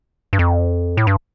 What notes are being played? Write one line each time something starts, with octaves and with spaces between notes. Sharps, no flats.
G2
F2
A2
G2